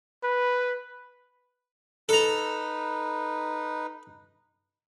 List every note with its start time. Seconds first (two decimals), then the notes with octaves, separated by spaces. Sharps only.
0.24 B4
2.09 D#4 A4 B4 A#5